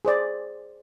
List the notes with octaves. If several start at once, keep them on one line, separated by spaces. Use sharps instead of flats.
G#4 C5 D5